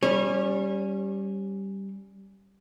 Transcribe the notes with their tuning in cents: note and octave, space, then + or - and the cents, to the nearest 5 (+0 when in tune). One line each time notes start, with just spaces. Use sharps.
G3 -5 C#4 +0 C#5 -35